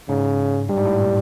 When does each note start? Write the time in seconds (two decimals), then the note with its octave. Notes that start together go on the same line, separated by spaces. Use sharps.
0.09 G#2 C#3
0.69 G2 G3
0.78 G#2
0.85 A2
1.00 A#2